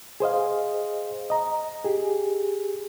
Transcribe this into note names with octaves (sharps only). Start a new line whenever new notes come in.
G#4 C5 D#5 F5
D#5 A#5
G4 G#4